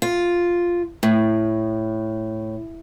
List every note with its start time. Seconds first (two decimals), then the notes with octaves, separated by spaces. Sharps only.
0.02 F4
1.03 A2